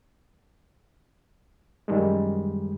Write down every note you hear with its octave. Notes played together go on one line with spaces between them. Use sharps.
F#2 D#3 G3 G#3